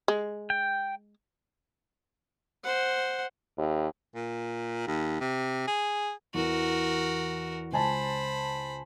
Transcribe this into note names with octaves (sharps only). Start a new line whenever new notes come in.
G#3
G5
C5 F#5
D#2
A#2
D#2
C3
G#4
E2 E3 F#4 A#4
C#2 C5 G#5 A5 B5